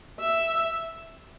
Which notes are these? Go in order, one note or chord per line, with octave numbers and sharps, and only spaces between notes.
E5